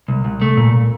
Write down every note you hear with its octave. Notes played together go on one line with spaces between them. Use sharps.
C2
C2
A3
A#2